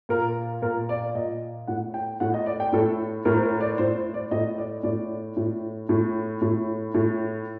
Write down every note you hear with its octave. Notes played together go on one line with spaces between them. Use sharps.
A#2 A#4
A#2 A#4
D5
A#2 D#5
A2 F#5
G5
A2 F#5
D#5
D5
G5
A2 A4
A2 A#4
C5
A#4
D5
A2 C5
C5
D5
A2 D#5
D5
A2 D5
A2
A2
A2
A2